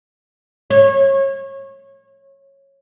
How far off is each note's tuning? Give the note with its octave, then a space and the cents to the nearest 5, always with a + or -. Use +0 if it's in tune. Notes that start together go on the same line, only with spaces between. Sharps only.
C#5 -30